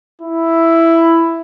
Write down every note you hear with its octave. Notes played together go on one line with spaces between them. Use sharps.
E4